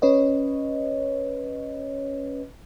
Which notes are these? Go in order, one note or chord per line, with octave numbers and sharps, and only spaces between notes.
C#4 B4 C#5 D#5